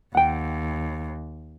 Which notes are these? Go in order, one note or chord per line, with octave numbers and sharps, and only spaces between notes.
D#2 F#5 G5